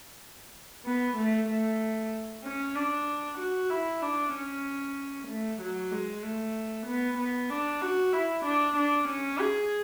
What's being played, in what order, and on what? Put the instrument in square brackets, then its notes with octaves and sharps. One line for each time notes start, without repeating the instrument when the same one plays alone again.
[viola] B3
A3
A3
C#4
D4
F#4
E4
D4
C#4
A3
F#3
G#3
A3
B3
B3
D4
F#4
E4
D4
D4
C#4
G#4